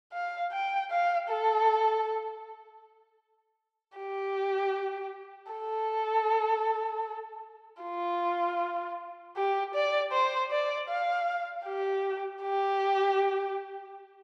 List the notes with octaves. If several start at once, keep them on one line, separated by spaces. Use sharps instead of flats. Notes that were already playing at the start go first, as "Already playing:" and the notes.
F5
G5
F5
A4
G4
A4
F4
G4
D5
C5
D5
F5
G4
G4